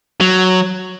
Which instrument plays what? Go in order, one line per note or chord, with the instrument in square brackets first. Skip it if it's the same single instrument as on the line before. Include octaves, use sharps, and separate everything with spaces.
[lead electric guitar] F#3